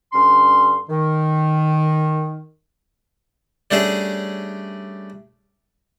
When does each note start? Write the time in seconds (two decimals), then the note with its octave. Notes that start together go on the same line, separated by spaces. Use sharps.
0.13 G2 D3 C#4 C6
0.89 D#3
3.71 G3 A3 C#4 D4 G#4